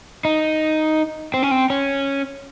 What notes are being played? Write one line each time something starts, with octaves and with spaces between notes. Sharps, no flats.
D#4
C4
C#4
C4
C#4